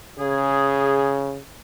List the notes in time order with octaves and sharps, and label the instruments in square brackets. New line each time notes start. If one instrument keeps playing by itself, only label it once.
[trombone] C#3 [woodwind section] G#4